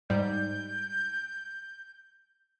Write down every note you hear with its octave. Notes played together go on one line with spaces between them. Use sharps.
G#2 G3 G6